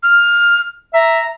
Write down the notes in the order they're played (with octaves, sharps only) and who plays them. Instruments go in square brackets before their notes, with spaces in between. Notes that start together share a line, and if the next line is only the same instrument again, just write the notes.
[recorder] F6
[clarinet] E5 [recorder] A#5